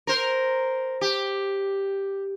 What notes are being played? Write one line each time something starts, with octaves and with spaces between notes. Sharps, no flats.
A#4 C5
G4